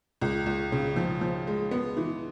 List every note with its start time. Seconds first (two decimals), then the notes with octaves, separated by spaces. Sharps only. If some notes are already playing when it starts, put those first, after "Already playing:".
0.22 C#2
0.46 C#2
0.72 C#3
0.96 F3
1.21 F3
1.47 G#3
1.71 B3
1.97 E3